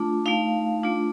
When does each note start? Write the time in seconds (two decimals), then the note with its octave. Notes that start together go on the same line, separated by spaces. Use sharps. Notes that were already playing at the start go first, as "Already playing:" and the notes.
Already playing: A3 D4 F4
0.26 A3 D#4 F5
0.83 A3 D4 F4